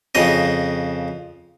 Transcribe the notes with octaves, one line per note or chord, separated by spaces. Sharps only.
F2 C#3 D#5